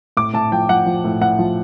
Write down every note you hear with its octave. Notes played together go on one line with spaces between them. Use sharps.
A2 D6
A2 A5
F3 G5
F3 F#5
F3
A2
A2 F#5
F3